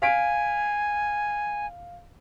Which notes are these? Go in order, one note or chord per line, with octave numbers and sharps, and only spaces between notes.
F5 G#5 B6 D7